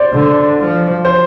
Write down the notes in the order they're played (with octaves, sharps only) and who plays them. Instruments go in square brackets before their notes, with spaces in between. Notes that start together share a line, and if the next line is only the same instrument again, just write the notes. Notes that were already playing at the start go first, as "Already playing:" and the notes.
Already playing: [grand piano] C5 D5
[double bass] D3
F3
[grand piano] C5